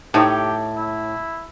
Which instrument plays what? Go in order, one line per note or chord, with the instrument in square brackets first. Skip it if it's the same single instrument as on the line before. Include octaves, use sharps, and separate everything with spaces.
[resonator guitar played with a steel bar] A2 [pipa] D#4 A4 C#5 [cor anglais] G4
[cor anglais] E4